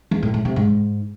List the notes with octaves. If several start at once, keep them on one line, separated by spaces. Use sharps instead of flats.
E2
A2
A2
C3
G#2